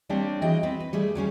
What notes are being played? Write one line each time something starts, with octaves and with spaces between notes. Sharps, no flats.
G3 A#3 C4 D4 G4 C#5
E3 A#3 F#4 G#4 D#5 G5
B3 C4 B4
B4
G3 A3 G#4
F#3 G3 C#4 G#4